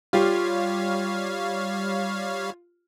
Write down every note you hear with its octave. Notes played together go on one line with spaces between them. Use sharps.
G3 F4 G4 C#5 F5